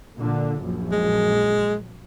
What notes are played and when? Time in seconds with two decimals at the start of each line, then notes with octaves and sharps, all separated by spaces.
0.16 A#2 D3
0.60 A#1 F#2
0.92 G#3